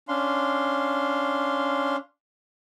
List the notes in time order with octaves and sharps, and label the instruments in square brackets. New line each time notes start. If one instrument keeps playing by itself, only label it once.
[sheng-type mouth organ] C#4 D4 F5 C6